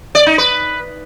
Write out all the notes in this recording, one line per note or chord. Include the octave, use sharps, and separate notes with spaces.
D5
D#4
B4